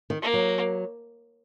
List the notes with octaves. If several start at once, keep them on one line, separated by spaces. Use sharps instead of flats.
D#3
A#3
F#3